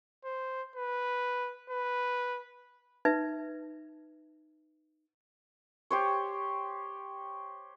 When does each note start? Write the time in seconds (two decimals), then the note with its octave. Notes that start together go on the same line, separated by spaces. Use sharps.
0.25 C5
0.76 B4
1.70 B4
3.05 D#4 B4 E5
5.90 G4 C5 C#5